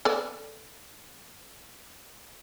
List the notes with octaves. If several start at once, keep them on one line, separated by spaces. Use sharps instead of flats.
A4 B4 D5